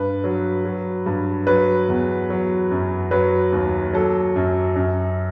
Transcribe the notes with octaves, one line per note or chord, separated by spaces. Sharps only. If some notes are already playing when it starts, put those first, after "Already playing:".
Already playing: G2 B4
F#3
F#3
G2
F#3 B4
E2
F#3
F#2
F#3 B4
D#2
F#3 A4
F#2
F#2